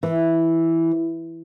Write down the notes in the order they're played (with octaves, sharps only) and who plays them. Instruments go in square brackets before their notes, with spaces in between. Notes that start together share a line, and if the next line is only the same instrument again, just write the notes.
[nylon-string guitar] E3